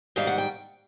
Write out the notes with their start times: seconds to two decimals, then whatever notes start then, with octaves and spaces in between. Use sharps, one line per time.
0.16 G#2 D#3 G3 F5
0.27 F#5
0.38 G5